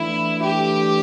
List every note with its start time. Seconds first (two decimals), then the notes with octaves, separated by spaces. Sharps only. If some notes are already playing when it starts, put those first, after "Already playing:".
Already playing: E3 A3 D4 E4
0.42 G4